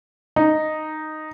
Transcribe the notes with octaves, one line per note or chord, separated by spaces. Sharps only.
D#4